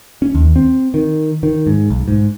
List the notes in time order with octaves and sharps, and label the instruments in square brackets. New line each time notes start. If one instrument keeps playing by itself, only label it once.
[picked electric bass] C#4
D#2
C4
D#3
D#3
G#2
B1
G#2